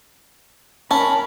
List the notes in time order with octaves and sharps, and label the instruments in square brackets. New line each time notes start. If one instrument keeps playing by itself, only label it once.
[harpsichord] C#4 [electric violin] A#4 B5 [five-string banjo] A5